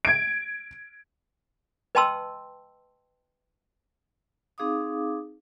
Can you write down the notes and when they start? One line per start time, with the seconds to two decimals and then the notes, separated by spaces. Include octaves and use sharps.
0.05 G#6 D7
1.95 B4 D#5 G5 A5 C6 E6
4.58 C4 D#4 G#4 F5 D6 D#6